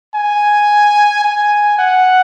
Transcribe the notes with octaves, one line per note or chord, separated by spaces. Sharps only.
G#5
G#5
F#5